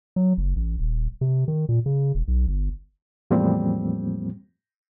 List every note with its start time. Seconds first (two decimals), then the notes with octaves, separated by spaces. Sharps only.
0.16 F#3
0.38 F#1
0.56 A1
0.80 D#1
1.21 C3
1.48 D#3
1.69 A#2
1.86 C#3
2.15 E1
2.28 B1
2.48 G1
3.31 E2 A2 F3 G3 A#3 C4